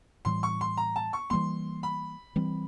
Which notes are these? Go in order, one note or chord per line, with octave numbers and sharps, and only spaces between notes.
A2 E3 G3 C6
C#6
C6
A#5
A5
C#6
E3 G3 A#3 C6
B5
E3 G3 C4